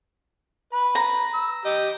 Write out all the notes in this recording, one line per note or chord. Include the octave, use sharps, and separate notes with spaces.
B4 B5
A#5
E6
G4 D#5